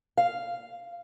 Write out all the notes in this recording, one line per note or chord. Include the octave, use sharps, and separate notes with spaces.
F5